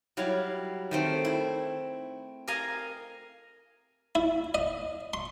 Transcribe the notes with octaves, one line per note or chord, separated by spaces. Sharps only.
F#3 G3 E4 F5
D#3 A3 C4
E4
A#4 D#5 F5 G#5 A#5
E4
D#5
C6